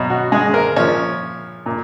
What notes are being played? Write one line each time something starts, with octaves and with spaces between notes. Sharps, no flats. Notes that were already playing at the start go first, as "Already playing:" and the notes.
Already playing: B2 F#3
F#4
G#3 G#4
A#3 A#4
A#2 F3 C#4 C#5
A#2